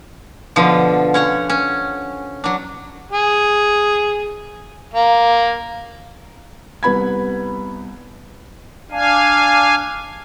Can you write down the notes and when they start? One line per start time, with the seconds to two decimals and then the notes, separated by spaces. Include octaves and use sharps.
0.56 B2 D3 F3
1.14 C#4 C#5 F#5
1.50 C#4
2.44 F#3 D4
3.12 G#4
4.93 A#3
6.83 C2 B3 B5 G#6
8.92 D4 F5 G#5